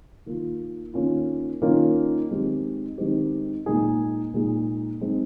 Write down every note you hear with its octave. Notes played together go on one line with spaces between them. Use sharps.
D#3 A#3 F4
D#3 A#3 C#4 F4
D#3 A#3 C#4 F4
D#3 G#3 C4 G4
D#3 G#3 C4 G4
A#2 G#3 D#4 G#4
A#2 G#3 D#4 G#4
G#3 C4 D#4